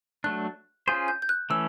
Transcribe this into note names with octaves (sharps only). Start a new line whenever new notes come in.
F#3 A3 D4 F#6
C#4 F4 G#4 C5 G6
G6
G6
F#6
E3 A3 C#4 E6